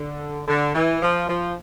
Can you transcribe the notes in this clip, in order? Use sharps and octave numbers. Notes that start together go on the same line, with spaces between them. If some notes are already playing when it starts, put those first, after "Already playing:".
Already playing: D3
D3
E3
F3
F3